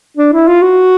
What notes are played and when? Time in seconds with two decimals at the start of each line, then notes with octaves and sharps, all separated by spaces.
0.17 D4
0.33 E4
0.47 F4
0.62 F#4